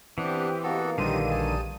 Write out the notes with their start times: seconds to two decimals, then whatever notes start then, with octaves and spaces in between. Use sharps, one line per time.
0.18 E3 B3 C4 D4 G4
0.63 B2 A#3 B3 F#4 A4
0.98 A#1 D3 D#3 G3 C4 D#4 F4 D#7
1.31 D#4 G#4 A5